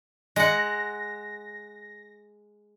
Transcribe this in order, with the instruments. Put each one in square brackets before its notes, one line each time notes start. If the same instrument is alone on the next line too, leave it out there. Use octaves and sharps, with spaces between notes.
[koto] G#3 F#5 [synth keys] A#6